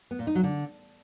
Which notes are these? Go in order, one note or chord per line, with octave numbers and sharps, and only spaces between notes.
B3
A#2
D#4
F#3
D3